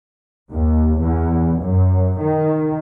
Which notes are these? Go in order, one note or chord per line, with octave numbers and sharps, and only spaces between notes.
D#2
E2
F#2
D#3